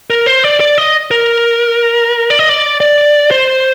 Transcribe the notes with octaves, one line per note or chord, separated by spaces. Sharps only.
A#4
C5
D5
D5
D#5
A#4
D5
D#5
D5
D5
C5